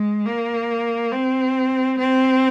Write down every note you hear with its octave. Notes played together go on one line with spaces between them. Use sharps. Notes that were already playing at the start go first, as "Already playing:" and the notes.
Already playing: G#3
A#3
C4
C4